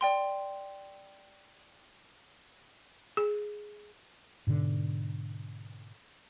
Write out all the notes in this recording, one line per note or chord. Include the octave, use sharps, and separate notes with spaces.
D5 G5 C6
G#4
G#2 B2 D3